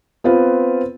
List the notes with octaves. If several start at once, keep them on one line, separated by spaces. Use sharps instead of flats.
B3 C4 F4 B4